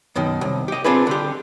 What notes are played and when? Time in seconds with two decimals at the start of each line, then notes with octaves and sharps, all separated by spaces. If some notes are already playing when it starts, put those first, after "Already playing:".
0.16 F#2 B2 D#3
0.41 C2
0.68 G4 D#5
0.84 C4 D4 F4 G#4 B4
1.07 D3 G4